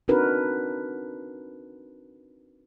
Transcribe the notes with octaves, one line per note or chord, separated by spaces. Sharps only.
C4 D4 D#4 F#4 A#4 B4